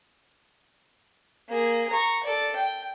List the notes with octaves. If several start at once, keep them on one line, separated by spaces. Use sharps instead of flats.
A#3 G#4
A#5 C#6
A4 D5
G5